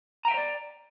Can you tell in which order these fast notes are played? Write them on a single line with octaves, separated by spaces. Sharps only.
A#5 G5 E5 C#5 D5